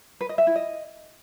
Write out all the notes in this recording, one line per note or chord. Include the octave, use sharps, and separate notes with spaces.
B4
D#5
E5
E4
D#5